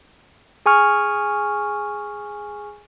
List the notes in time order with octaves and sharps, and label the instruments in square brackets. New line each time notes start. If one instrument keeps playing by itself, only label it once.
[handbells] G#4 G#5 C#6 F6